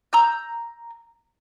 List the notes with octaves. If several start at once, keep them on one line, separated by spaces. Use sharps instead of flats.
A#5 E6 G6